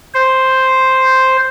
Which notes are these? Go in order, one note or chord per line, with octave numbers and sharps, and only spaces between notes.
C5